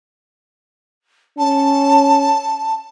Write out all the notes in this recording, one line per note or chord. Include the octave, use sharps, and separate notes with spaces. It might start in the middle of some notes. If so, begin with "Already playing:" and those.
C#4 A5